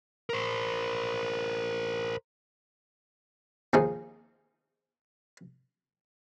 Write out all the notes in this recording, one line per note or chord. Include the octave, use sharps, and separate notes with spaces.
A#4 C5
D#2 F3 G#3 D#4